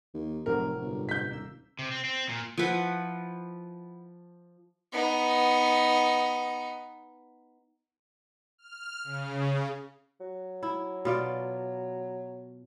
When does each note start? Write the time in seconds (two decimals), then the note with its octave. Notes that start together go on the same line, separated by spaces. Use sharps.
0.14 D#2
0.46 F1 A2 C3 F#3 A#4
0.81 G1
1.09 G6 B6
1.31 D#1 A#3 E6
1.79 C3
1.91 C4
2.04 C4
2.29 A#2
2.58 F3 E4 B4 F#5
4.93 B3 D#4
8.58 F6
9.04 C#3
10.20 F#3
10.63 E4
11.05 B2 F4 D5